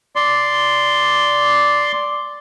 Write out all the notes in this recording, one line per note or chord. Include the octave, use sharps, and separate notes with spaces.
D5 C6